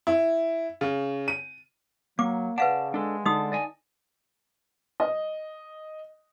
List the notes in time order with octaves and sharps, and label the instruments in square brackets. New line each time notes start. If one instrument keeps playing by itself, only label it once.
[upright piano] E4
C#3
D#7
[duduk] F#3 [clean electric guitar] A#3 [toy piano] D6
[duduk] C#3 [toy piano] B4 F5 F#5 [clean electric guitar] D5 A5
[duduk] G#3 [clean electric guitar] D4 A4
[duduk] D3 [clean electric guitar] G#3 [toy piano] D#4 F#4 D#6
[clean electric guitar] D5 D#5 G#5
[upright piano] D#5